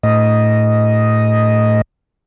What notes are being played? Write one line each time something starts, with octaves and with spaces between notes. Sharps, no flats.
A2 D#5